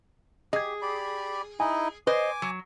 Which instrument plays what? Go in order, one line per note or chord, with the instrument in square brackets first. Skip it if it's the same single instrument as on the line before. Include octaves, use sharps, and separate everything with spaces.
[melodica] G4 [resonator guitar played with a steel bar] G#4 [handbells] D#5 G#6
[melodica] G4 D5 B5
[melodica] D#4 E4 D#5 [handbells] G#5
[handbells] B4 [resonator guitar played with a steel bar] C5 D#5 [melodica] G#5 D6
[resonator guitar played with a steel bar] F#3